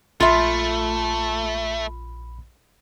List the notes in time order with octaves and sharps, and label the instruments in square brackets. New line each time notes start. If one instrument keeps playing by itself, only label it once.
[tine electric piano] A#1 B5 [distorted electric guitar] A3 [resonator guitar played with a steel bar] F4 E5